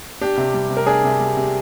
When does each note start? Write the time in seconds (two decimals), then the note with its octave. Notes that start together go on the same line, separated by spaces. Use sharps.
0.21 D4 G4
0.37 C3
0.54 G3
0.70 C3
0.77 A#4
0.86 D4 G#4
1.04 C3
1.20 G3
1.37 C3